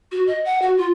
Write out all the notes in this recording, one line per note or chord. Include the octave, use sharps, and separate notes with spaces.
F#4
D#5
F#5
F#4
F4